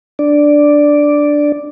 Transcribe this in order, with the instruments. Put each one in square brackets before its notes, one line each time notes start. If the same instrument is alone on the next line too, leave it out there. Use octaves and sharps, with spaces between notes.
[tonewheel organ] D4 D5